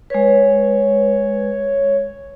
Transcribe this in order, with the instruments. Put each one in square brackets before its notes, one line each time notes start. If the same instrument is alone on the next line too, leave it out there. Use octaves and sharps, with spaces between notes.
[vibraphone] G#3 B4 [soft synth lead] C#5